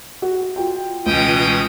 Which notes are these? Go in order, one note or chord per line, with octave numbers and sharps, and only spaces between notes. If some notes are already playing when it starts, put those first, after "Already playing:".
F#4
F4 F#4 G5
C#2 B2 E3 C#4 G5 D#6